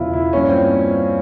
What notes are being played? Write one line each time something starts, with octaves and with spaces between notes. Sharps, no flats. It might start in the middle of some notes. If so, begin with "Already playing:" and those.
Already playing: E1 E2 C#3 F3 E4 F4
E4
G2 F3 A#3 C#4
C4